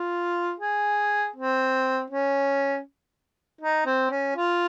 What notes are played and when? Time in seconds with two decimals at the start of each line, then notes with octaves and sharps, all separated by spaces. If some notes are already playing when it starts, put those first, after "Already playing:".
Already playing: F4
0.60 G#4
1.36 C4
2.10 C#4
3.61 D#4
3.86 C4
4.11 C#4
4.36 F4